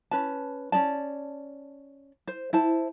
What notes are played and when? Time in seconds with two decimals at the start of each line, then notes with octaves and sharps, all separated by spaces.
0.11 C#4 B4 A5
0.72 C#4 D#4 D5 A5
2.27 C5
2.53 E4 C5 A5